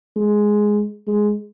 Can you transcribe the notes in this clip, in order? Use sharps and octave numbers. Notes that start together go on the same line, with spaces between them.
G#3
G#3